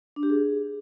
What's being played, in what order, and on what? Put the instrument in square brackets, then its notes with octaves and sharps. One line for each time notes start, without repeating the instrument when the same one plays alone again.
[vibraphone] D4
G4
G#4